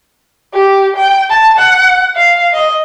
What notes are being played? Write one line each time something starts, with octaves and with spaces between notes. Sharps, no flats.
G4
G5
A5
F#5
F5
D#5